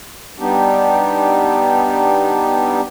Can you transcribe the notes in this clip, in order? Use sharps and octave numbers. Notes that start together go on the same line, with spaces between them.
G3 B3 D4 D#4 G4